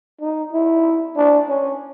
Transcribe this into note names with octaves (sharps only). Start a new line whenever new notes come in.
D#4
E4
D4
C#4